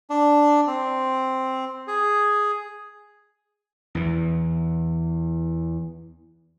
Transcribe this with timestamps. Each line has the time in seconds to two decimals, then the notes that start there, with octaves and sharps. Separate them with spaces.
0.10 D4
0.67 C4
1.88 G#4
3.95 E2 E3